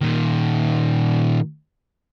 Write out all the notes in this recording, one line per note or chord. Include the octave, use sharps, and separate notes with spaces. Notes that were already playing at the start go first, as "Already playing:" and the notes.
A#2 D#3